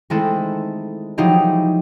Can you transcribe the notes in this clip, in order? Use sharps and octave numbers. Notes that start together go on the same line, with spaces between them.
D#3 G#3 A3 C4 E4 A4
F3 F#3 D#4 E4 G4 G#4